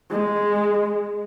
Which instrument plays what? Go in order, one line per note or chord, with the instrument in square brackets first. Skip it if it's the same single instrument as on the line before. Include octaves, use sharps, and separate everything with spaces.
[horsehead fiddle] G#3